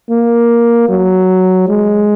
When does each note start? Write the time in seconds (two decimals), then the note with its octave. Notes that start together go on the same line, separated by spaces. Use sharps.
0.10 A#3
0.89 F#3
1.69 G#3